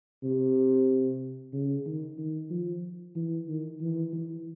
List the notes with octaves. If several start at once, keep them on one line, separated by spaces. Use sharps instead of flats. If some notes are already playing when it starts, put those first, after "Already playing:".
C3
C#3
D#3
D#3
F3
E3
D#3
E3
E3